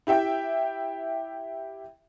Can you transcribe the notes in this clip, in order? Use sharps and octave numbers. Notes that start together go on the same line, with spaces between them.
E4 G4 E5 G5